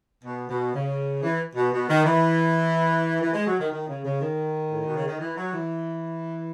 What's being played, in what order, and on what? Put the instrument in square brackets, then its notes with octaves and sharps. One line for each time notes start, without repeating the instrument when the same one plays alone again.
[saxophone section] B2
B2
C#3
E3
B2
B2
D#3
E3
E3
G#3
F#3
D#3
D#3
C#3
C#3
D#3
A2
B2
C#3
D#3
E3
F#3
E3